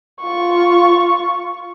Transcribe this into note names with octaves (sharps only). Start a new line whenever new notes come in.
F4 C#6